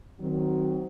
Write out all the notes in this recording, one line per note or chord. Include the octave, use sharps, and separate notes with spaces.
D#3 F#3 C4